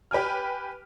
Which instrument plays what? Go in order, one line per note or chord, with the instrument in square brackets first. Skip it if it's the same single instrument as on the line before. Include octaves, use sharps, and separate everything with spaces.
[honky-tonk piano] G4 B4 G5 G#5 F6